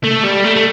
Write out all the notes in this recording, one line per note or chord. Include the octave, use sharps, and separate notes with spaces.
A3
G3
A3
A3